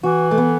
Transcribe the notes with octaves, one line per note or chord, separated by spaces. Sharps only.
E3 F#4
A3
B3